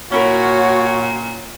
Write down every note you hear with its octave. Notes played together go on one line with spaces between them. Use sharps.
A#2 C#4 E4 F#4 A#4 C#5